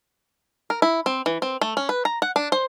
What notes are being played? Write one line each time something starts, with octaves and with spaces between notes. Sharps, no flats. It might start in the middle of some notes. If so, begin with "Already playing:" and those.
A#4
E4
C4
E3
C4
A3
C#4
B4
A#5
F#5
D4
C5